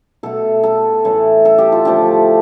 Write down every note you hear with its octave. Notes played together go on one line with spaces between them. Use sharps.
B2 A3 A4
A4
A2 E3 A3
A4
G4
F4
D3 F3 A3 G4